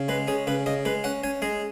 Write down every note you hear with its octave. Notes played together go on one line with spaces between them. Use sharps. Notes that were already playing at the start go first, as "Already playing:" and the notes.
Already playing: C#3
G#3 B4
C#4 G#4
C#3 B4
C#3 D#5
G#3 B4
C#4 F#5
C#4 G#5
G#3 G#4